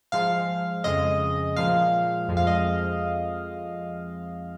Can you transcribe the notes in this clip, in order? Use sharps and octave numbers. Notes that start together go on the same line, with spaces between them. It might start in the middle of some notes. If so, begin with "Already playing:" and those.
G#2 F3 G#3 F5
F2 C#3 G#3 D#5
A#2 F3 G#3 F5
F2 F3 G#3
F5
D#5